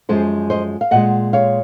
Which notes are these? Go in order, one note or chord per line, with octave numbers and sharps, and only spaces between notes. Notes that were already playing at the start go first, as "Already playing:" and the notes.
F#2 F3 G#3 G#4 C5
C5 D#5
F5
A#2 G#3 D#5 F#5
C#5 F5